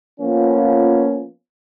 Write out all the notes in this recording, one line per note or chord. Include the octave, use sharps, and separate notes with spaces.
F3 A#3 B3 C#4 F4